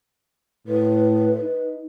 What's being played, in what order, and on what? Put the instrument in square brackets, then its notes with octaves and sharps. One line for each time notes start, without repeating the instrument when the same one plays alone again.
[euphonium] A2 [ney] B4
[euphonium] D#4